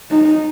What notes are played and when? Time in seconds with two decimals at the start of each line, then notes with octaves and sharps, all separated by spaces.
0.11 D#4